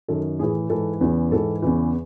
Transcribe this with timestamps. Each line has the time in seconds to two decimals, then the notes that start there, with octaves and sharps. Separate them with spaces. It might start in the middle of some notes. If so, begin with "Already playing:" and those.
0.08 F#2 D#3 A4
0.39 A2 E3 G#4
0.70 G#2 E3 A4
1.01 E2 C#3 E3
1.31 G#2 E3 A4
1.62 E2 C#3 E3